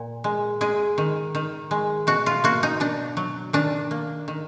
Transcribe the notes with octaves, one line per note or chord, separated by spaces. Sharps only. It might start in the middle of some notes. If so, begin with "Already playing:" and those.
Already playing: A#2
G#3
G#3 G#4
D#3
D#3
G#3
B2 F#4
F4
A#3 F#4
D#4
B2 D4
F#3
D#3 D4
A#3
D#3